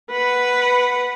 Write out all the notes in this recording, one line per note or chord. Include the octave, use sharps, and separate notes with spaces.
B4 F#5